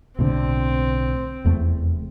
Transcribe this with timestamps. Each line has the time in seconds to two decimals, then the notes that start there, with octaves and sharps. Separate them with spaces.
0.19 B1 A2 D3 C4
1.45 F1 E2 A3